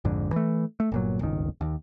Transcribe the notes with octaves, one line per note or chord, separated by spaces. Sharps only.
A#1 F2 G#2 D3
E3 A3
A3
G1 A#2 F#3
D1 G1 C#2 D#3
D#2